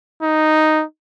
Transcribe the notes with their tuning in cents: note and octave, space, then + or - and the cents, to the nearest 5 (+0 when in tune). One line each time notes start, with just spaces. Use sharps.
D#4 -5